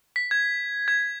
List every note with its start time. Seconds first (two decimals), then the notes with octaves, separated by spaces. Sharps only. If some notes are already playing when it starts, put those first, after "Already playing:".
0.16 B6
0.31 G#6
0.88 G#6